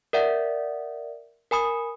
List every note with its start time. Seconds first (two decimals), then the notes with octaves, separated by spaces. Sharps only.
0.13 A#4 D5 E5 F#5
1.51 A#4 G#5 B5 D#6